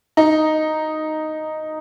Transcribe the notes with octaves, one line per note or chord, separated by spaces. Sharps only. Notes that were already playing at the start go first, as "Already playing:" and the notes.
D#4